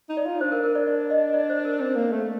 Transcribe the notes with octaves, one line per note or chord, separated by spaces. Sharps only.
D#4
D5
F4
D4 C5
A#4
A#4
D5
D5
D#5
D5
C5
A#4
C4
A#3
A3